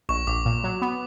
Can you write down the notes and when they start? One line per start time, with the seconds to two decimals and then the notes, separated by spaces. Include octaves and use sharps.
0.09 A#1 C#6
0.27 A#1 D6
0.46 A#2
0.64 F#3
0.82 B3